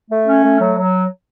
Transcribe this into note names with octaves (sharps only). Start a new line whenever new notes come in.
A3
C#4
A3
F#3
F#3